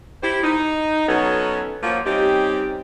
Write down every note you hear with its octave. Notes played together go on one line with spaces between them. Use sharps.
E4 G4 C5
D#4
B2 F#3 B3 C#4 D#4 A4
F3 F#3 A#3
G3 C4 C#4 D#4 G4